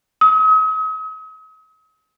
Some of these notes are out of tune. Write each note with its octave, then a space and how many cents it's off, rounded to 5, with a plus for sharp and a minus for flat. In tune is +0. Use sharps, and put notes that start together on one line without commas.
D#6 +45